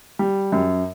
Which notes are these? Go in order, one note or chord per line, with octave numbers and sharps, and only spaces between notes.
G3
F#2